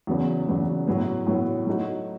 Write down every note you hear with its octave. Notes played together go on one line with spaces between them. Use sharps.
E2 C#3 F#3 B3
E2 C#3 F#3 B3
A2 F#3 B3
A2 F#3 B3
F#3 A3 D#4 F#4